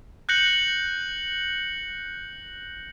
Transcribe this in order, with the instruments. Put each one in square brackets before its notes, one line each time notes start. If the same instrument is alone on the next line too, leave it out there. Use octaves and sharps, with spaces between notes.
[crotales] F#6 G6 A#6 C#7 F#7